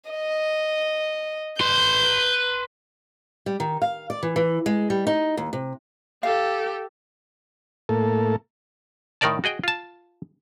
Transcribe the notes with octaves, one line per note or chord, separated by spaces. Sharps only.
D#5
B4 C6 G6
G3
D#3
F5
D5
E3
E3
G#3
G3
D#4
D#2
C3
G4 A4 F5
A2 A#3 A4
A2 D#3 D#4 A#4 D5 A5
F#4 G#4 D#5 G5
F4 A5